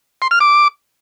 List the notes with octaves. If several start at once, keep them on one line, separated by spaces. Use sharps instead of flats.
C6
F6
D6